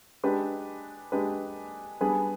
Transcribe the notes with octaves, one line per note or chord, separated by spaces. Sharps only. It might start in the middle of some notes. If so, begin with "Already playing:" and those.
G#3 D4 G4 B4
G#3 D4 G4 B4
G3 B3 D4 G#4 B4